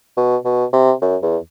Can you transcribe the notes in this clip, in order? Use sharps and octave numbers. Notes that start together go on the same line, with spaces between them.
B2
B2
C3
F#2
E2